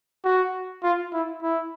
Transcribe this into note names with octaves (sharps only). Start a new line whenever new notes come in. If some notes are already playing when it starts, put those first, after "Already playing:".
F#4
F4
E4
E4